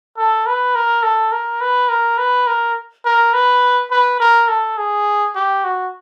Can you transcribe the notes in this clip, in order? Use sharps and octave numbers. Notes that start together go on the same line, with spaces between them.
A4
B4
A#4
A4
A#4
B4
A#4
B4
A#4
A#4
B4
B4
A#4
A4
G#4
G4
F#4